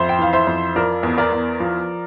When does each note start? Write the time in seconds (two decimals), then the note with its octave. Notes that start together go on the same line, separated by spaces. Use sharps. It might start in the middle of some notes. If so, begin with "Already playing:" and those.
Already playing: F2 C5 E5
0.09 G5
0.19 E3 F5
0.33 C5 E5
0.47 F2
0.76 F3 A#4 D5
1.03 E2
1.18 A#4 D5
1.32 E2
1.60 F3